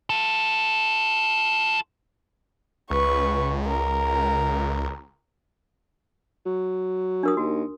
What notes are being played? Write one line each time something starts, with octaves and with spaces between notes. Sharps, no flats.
F4 A4
C#2 B4 C#6
A#4
F#3
D4 A#4 D#6
D#2 F#4